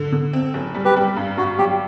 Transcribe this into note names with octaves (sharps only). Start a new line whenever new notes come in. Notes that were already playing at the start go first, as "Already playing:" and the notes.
Already playing: D3
D3
C4
F#1
G3
G4 B4
G3
G2
G2 F#4
F#3 G4